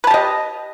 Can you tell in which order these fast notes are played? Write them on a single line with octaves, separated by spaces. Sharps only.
B4 A5 G4 D#5